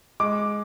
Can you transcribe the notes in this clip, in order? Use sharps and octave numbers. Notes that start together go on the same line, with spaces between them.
G#3 D6